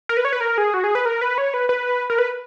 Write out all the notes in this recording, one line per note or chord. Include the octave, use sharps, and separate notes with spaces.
A#4
B4
C#5
B4
A#4
G#4
F#4
G#4
B4
A#4
B4
C#5
B4
B4
A#4
B4